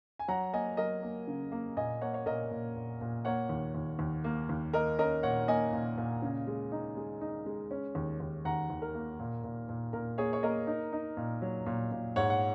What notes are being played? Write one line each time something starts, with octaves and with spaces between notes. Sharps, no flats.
G#5
F#3 F#5 A#5
A#3 D#5 G#5
F#3 A#4 D#5
A#3
C#3
A#3
A#2 D#5 G#5
A#3 C#5 F#5
C#5
A#2 A#4 D#5
A#2
A#2
A#2
A#3 C#5 F#5
D#2
D#2
D#2
A#3
D#2
A#3 A#4 D#5
C#4 A#4 D#5
A#2 C#5 F#5
A#3 D#5 G#5
A#2
A#2
C#3
G#3
D#4
G#3
D#4
G#3
C#4
D#2
D#2
D#2 F#5 A#5
D#2
A#4
A#3
A#2
A#2
A#2
A#2 A#4
A#3 G#4 C#5
C#5
A#3 A#4 D#5
D#4
D#4
A#2
F#3
A#2
A#2
G#2 C#5 F#5
F#5